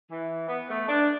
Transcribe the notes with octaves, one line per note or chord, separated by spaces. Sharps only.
E3
B3
A3
D4